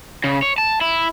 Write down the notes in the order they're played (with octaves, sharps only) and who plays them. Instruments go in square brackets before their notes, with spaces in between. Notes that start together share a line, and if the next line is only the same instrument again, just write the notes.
[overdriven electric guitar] C#3
C#5
A5
E4